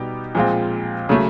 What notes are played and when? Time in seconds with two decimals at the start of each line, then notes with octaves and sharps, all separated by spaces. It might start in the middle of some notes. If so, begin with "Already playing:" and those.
Already playing: B2 G3 B3 D#4 G4
0.35 A#2 F3 G#3 C4 F4
1.09 C#3 F#3 A3